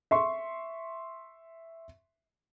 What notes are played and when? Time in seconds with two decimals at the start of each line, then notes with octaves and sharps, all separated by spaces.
0.11 E5 C6 C#6